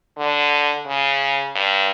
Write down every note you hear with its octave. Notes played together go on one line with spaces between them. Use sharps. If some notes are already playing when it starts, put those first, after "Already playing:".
D3
C#3
G2